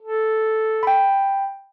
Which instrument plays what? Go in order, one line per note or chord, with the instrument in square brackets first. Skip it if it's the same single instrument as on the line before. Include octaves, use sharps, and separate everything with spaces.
[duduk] A4
[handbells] G5 B5